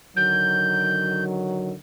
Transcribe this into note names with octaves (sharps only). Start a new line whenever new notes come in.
D3 D#3 F#3 G6